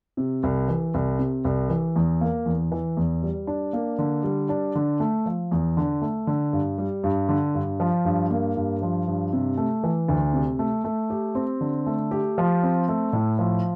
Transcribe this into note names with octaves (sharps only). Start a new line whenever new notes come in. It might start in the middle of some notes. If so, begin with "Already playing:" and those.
C3
C2
E3
C2
C3
C2
E3
E2
A#3
E2
E3
E2
G3
D4
A#3
D3
G3
D4
D3
A3
F3
E2
D3
A3
D3
G2
G3
G2
D3
G2
F3
G2
A#3
G2
F3
G2
C3
A3
E3
D2
C3
A3
A3
G4
C4
D3
A3
G4
F3
C4
A3
A2
F3